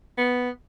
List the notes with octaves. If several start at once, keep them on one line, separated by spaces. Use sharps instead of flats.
B3